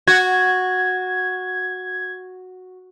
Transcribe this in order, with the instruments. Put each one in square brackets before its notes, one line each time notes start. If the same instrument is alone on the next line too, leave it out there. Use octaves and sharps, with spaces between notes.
[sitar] F#4 [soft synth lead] G#6